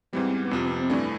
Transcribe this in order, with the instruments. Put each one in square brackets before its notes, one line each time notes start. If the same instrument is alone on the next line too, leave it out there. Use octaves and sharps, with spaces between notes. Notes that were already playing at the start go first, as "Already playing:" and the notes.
[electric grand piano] G#2 E3 G3 [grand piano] C4
[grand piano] B3
B3
[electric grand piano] F2 C3 F3 [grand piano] C4
[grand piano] B3
C4
[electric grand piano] G2 E3 A3 [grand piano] D4